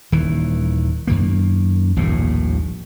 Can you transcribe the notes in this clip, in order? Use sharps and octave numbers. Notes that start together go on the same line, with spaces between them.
D#1 D#3 E3
F#2 D#3 A#3
D#1 A#1 D#2 A2